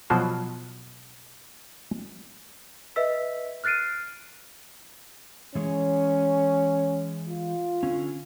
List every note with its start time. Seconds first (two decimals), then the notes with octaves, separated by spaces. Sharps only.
0.10 B2 F3 F#3 C5 A5
2.96 B4 D#5 E5 E6 B6
3.64 F6 F#6 A6 C7 D7 D#7
5.55 E3 G#3 C#4 C#5
7.29 F4
7.83 D3 C#4